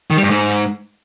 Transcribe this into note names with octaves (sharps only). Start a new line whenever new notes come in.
D#3
G3
G2
G#2